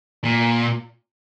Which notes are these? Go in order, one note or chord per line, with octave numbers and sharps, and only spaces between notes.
A#2